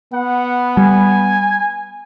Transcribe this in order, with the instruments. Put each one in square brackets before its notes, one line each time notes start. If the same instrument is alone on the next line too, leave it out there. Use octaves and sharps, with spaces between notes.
[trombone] B3 [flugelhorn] F#5
[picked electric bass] G3 [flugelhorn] G#5